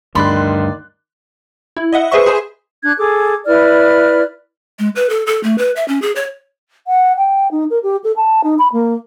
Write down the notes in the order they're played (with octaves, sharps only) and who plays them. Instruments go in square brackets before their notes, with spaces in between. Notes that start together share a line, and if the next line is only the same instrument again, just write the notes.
[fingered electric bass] D2 G2 [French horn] D#3 [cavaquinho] D5 B5 [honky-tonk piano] C6 F#6
[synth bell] E4
D#5 E5 F#5
G#4 B4 C5 D#5 E5 C#6
G#4 C5 G#5
[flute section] D4 F#6 G#6
G#4 A4 D6
E4 B4 D5 F6
[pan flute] G#3
B4
A4
A4
A3
B4
E5
C#4
G#4
C#5
[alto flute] F#5
G5
D#4
A#4
G4
A4
A5
D#4
B5
A#3